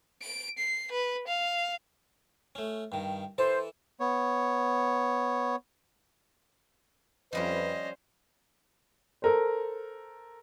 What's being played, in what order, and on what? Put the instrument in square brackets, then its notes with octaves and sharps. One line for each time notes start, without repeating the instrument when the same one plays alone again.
[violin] D7
C7
B4
F5
[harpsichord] A3 C#4
G2 D#3
[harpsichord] E3 A4 A5 [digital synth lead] C5
[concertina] B3 C#5
[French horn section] F2 B4 [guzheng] F3 G3 F#4 [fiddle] C#4 C5 [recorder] D#5
[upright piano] A4 A#4 C5